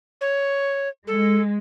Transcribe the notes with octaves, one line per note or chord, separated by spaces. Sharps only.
C#5
G#3 A4